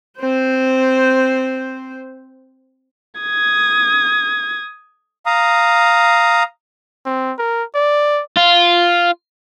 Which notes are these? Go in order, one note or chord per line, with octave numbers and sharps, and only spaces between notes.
C4 C5
D#6 G#6
F5 A#5 D#6
C4
A#4
D5
F4